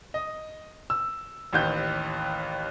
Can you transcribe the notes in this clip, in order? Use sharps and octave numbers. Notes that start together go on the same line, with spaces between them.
D#5
E6
A1 D#2 G6